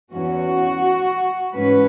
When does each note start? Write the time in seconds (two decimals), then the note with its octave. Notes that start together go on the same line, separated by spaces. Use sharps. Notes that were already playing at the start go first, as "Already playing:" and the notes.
0.12 E2 E3 C#4 F#4
1.54 G#2 E3 C#4 B4